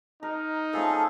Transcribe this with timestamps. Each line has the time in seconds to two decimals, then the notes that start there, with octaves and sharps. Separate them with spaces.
0.23 D#4 A#4
0.73 F3 A3 C#4 G#4 A4